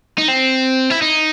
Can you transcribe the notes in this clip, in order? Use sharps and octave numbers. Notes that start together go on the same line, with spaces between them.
D#4
C4
E4
D#4